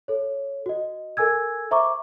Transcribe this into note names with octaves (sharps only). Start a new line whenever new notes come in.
A4 C#5
F#4 D#5
A4 A#4 G#5 E6 G#6
C5 E5 A#5 C#6 D6